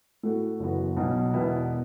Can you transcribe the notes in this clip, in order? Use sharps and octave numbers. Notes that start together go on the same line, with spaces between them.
A2 A3 F#4 A4
F#1 F#2 E3 B3 F#4
B1 B2 F#3
E1 E2 B2 B3 E4